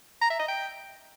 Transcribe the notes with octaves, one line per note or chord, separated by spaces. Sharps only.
A#5
E5
D#5
G5